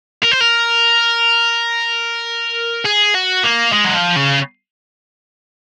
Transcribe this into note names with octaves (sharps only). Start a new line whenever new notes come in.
A#4
C5
A#4
G#4
F#4
A#3
G#3
F#3
F3
C#3